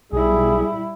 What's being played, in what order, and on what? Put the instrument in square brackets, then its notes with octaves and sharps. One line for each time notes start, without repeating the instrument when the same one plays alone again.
[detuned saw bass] B1 [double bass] G3 E4 [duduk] G#4